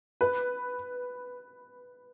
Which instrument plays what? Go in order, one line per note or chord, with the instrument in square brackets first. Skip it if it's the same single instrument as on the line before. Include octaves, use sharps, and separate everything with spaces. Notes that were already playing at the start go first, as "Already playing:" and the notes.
[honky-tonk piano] B4